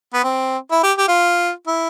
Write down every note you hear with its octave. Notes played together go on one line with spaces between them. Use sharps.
B3
C4
E4
G4
G4
F4
E4